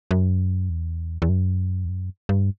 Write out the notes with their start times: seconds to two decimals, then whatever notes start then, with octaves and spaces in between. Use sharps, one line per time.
0.11 F#2
0.70 E2
1.22 E2
1.29 F#2
1.85 E2
1.89 F#2
2.29 G2